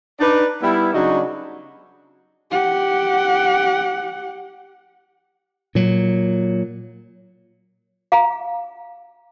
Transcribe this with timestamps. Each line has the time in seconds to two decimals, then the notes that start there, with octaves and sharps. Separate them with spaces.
0.20 D4 D#4 B4 D5
0.62 G3 B3 E4
0.94 C#3 F#3 D4 D#4 F#4
2.51 G4 F#5
5.75 A#2 F#3
8.12 F5 A#5